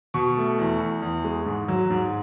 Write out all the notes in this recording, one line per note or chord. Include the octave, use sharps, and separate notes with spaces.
B2 C#6
A3
E2
E2
E2
G#3
G#2
F#3
G#2